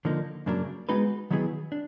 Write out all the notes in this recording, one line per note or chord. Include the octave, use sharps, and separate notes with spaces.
D3 F3 A#3 D#4
F#2 C#3 F#3 A#3 D4
G#3 B3 D#4 F#4 B4
D#3 F#3 B3 E4 G#4
D4